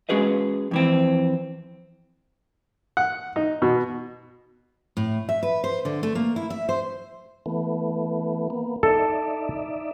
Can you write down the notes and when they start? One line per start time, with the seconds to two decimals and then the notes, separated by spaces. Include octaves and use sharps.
0.09 G#3 C#4 F#4 G#4 B4 D#5
0.71 F2 E3 C4
2.97 F#5
3.36 D#4
3.62 B2
4.97 A2
5.29 E5
5.43 B4
5.64 C5
5.85 D3
6.03 A3
6.15 A#3
6.36 E4
6.50 E5
6.69 C5
7.46 E3 A3 B3
8.50 A#3 B3
8.83 D#4 A4 D5 E5